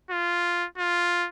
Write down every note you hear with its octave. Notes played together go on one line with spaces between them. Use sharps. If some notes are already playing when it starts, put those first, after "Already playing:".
F4
F4